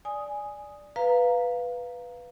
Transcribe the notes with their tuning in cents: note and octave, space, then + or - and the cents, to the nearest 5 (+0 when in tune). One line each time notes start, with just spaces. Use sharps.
D5 +0 G#5 +0 D#6 +0
B4 +0 F5 +0 A#5 +0